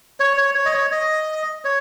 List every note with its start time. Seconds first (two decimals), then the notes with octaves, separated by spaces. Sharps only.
0.20 C#5
0.38 C#5
0.55 C#5
0.65 D#5
0.74 C#5
0.92 D#5
1.65 C#5